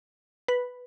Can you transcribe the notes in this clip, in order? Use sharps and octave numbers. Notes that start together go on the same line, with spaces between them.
B4